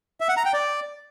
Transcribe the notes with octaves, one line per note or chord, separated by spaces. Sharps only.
E5
F#5
A#5
G5
D5